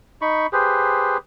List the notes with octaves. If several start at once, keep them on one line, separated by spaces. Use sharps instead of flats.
D#4 B5 C#6
G4 G#4 B4 C5